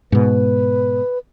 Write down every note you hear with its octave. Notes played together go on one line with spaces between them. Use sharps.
G#2 B2 B4